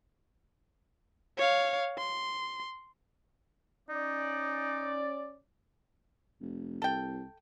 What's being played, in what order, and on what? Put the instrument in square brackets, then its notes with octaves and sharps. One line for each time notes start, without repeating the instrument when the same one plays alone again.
[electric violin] C#5 F5
C6
[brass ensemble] C#4 D5 [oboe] D#4
[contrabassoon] F1
[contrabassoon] C2 [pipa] A4 G5